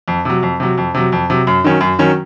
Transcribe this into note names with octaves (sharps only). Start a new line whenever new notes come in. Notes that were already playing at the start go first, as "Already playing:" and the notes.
F2
C3 F#3
F2
C3 F#3
F2
C3 F#3
F2
C3 F#3
F#2
D#3 F#3 C#4
F#2
D#3 F#3 C#4